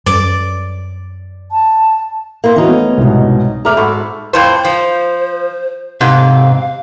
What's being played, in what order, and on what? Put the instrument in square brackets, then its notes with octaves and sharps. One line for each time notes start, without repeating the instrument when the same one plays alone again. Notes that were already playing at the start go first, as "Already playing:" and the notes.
[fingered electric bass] F#2 G3 [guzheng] D5
[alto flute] A5
[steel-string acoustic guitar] A#3 E4 C5
[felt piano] E3 F#4 [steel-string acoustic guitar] C#4 D#4
[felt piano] A3 B3
C2 G#2 B2
[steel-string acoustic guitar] A3 D5 A#5 [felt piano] G#4 E5 F6
[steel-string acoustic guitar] G#2 F#4 A4 [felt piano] B5 C#6 E6
[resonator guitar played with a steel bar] F2 A2 C5
[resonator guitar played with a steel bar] F3 [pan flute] C5
[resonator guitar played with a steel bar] G#2 [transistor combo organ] C3 [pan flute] F5